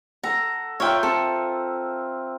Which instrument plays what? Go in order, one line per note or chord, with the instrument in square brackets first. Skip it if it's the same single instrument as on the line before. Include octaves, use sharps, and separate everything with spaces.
[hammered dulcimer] A4 F#5 [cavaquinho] A#5
[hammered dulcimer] F4 A#4 E5 [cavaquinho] C#5 G5
[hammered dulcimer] C4 [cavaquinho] A4